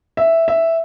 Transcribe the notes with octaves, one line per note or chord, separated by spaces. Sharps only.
E5
E5